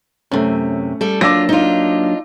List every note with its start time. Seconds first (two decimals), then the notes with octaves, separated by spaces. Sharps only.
0.31 F#2 C3 A3 C#4
1.01 G3 A4
1.21 F#3 A#3 D4 F4 D6 E6 A#6
1.49 D#4 F4